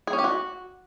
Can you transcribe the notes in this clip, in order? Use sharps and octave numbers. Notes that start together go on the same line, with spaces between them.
G#4
C#4
G4
F#4